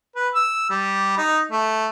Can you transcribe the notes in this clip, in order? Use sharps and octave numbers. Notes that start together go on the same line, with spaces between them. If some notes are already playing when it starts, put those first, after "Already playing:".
B4
E6
G3
D#4
A3